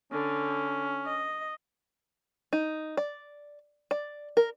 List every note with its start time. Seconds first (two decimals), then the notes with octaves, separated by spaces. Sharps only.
0.12 D3 C#4
1.06 D#5
2.53 D#4
2.97 D5
3.91 D5
4.37 A#4